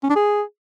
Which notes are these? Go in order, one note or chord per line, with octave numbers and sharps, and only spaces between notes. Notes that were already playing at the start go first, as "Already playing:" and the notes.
C#4
D4
G#4